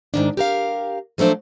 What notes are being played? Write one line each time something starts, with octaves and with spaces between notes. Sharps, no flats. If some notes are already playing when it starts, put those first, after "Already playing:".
G#2 D#3 D4
G4 A#4 F5
F3 F#3 A3 D4 C5